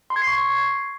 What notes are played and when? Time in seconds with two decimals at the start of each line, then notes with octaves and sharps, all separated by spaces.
0.10 C6
0.16 G#6
0.22 C7
0.27 C#6